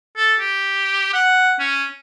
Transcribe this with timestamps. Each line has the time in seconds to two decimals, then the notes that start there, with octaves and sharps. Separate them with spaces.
0.17 A4
0.40 G4
1.14 F#5
1.60 C#4